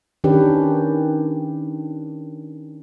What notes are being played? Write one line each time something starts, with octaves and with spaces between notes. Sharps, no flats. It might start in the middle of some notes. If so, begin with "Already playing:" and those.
D#3 C#4 D4 G4 B4